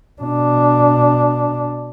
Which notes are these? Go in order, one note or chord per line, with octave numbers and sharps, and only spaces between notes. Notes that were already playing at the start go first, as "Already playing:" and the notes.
B2 D4